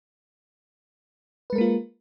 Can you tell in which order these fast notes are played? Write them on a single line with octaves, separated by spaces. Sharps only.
B4 G#3 A#4 A#3 F4